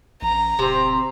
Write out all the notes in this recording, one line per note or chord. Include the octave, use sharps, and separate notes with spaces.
A1 A#5
D1 C3 C4